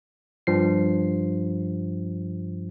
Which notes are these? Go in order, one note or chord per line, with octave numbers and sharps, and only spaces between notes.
G2 F3 C7